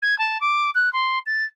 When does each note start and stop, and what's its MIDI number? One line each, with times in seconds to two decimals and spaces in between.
0.02 0.17 92
0.18 0.38 81
0.41 0.70 86
0.75 0.92 90
0.93 1.19 84
1.26 1.44 93